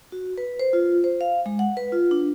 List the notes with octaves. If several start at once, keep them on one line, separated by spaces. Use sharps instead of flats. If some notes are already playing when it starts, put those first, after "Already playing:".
F#4
B4
C5
F4
C5
F5
G#3
F#5
B4
F4
D4